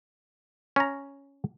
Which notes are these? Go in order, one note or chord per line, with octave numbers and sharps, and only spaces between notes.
C#4 A#5